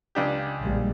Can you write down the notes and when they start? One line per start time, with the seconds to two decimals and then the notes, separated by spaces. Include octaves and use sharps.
0.15 C#2 D4 G4
0.61 A#1 G3 G#3